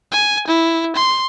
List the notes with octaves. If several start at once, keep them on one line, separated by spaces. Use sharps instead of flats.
G#5
E4
C6